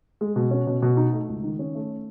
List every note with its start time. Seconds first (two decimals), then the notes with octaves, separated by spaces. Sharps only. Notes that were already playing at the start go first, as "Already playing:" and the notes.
0.21 G#3
0.36 B2
0.51 C#4
0.67 B2
0.82 B2
0.97 D#4
1.13 A3
1.29 C#2
1.43 D#3
1.59 C#4
1.75 A3